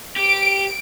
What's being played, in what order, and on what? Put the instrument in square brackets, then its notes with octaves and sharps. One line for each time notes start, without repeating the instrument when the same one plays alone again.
[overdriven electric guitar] G4 [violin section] D7